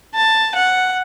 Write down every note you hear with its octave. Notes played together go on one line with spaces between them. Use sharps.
A5
F#5